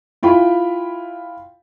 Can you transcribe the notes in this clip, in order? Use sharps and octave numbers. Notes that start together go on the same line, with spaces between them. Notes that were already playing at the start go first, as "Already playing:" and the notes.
E4 F4 G5 B5